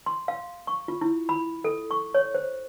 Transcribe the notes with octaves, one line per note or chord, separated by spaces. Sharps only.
C6
F5
C#6
F4
E4
B5
A4
C#6
C#5
C5